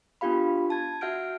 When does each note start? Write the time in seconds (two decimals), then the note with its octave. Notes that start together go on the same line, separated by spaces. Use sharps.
0.21 B3 D4 F4 G4 F5 B5
0.70 A5 G#6
1.01 F#4 E5 F#5 F6 G6 D7